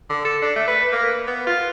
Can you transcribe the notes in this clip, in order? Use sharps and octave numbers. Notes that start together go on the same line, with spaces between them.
D3
A4
D4
A3
B4
A#3
B3
F4